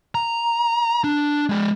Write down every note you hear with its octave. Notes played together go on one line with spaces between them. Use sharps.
A#5
D4
G#3 D5